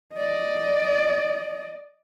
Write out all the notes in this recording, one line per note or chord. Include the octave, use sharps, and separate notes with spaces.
D5 D#5